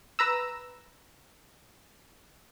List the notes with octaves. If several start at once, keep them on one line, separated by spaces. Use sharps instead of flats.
B4 A#5 E6